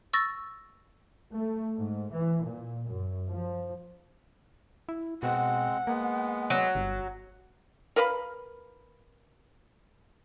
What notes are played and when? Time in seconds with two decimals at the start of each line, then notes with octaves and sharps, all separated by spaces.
0.13 C#6 E6 A6 A#6
1.34 A3
1.77 G#2
2.13 E3
2.43 A#2
2.88 F#2
3.30 F3
4.89 E4
5.23 B2 G#3 C4 F#5
5.87 G#3 A#3 B3
6.50 F#3
6.75 G1
7.96 A#4 B4 F5 B5